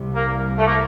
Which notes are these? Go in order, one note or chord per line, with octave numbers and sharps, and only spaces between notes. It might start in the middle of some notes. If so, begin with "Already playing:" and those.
Already playing: C2 C3 G3
A#3
A3
A#3